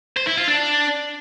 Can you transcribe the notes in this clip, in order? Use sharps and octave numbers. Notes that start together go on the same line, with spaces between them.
C5
E4
F4
D4